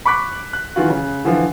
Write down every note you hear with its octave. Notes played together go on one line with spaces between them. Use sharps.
B5 C#6 D6 F#6 B6
F#6
D#3 E3 F4 F#4
C#3
D3 E3 F3